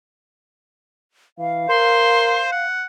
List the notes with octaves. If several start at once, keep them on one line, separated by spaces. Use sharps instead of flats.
E3 F5
A#4 C5 C6
F#5